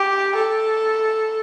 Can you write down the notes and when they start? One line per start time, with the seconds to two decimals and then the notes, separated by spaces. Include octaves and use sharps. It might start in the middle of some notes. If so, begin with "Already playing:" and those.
Already playing: G4
0.35 A4